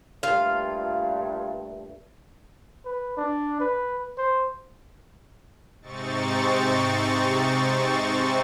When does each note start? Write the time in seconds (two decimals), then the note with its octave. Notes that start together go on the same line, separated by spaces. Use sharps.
0.23 G2 A#2 A3 F4 F5
2.85 B4
3.17 D4
3.60 B4
4.18 C5
5.82 G#2 C3 C4 D#4 C#6 A6